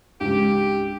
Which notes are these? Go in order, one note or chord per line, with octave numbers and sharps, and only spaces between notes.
C#2 G#2 D4 G4